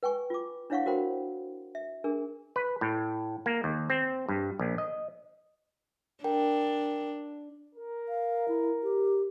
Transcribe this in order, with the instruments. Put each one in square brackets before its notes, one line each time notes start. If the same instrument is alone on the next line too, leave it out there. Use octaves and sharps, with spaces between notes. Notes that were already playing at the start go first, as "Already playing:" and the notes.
[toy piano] B4 G5 G#5 C#6
F4 D6
D4 E4 C#5 F5 F#5 C#6
F#4 A#4 C5 G5 B5
E5
D4 G#4 A#4
[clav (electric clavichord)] B4
A2
A#3
D#2
C4
G2
A#1
D#5
[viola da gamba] D4 [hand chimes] A#4 G5
[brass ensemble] A#4
[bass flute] F5
E4
G4